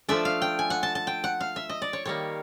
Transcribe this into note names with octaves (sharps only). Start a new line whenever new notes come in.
F3 A3 D4 E5
F5
G5
G#5
F#5
A5
A5
G5
F#5
F5
E5
D#5
D5
C#5
D#3 G3 A#3 C#5